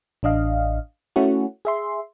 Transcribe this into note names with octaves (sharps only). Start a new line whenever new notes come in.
A1 D4 D#5 F5
A3 C#4 E4 F#4
G#4 E5 C6